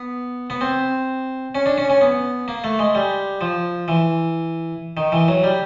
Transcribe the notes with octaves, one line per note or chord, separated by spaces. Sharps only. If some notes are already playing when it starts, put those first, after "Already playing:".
Already playing: B3
B3
C4
C#4
D4
C#4
C#4
B3
A#3
A3
G#3
G3
F3
E3
D#3
E3
F#3
G3